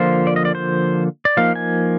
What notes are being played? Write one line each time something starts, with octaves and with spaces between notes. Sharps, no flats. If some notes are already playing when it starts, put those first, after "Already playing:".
Already playing: D3 F3 A#3 F4 C5
D5
D#5
D5
C5
D5
F3 A#3 D#4 F5
G#5